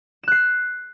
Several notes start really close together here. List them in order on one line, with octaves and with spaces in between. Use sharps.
E7 F#6 C7